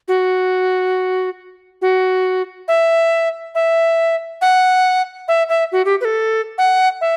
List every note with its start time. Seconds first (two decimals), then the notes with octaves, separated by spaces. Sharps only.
0.08 F#4
1.82 F#4
2.68 E5
3.55 E5
4.41 F#5
5.28 E5
5.49 E5
5.72 F#4
5.85 G4
6.01 B4
6.05 A4
6.58 F#5
7.01 E5